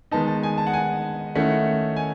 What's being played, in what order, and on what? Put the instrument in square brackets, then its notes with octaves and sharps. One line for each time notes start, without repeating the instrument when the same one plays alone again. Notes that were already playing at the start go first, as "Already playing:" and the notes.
[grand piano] D#3 G#3 B3 D#4 A5
A5
G#5
A5
F#5
G#5
D#3 A3 C#4 E4 F#5
G#5